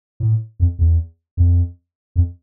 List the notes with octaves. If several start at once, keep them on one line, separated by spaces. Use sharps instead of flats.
A2
F2
E2
F2
F2